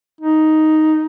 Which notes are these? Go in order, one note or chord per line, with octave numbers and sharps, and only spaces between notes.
D#4